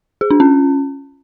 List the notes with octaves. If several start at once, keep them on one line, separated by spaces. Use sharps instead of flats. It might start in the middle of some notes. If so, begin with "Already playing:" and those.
G#4
D4
C#4